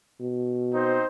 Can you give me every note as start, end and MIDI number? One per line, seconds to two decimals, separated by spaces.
0.21 0.99 47
0.75 1.06 60
0.75 1.06 63
0.75 1.06 72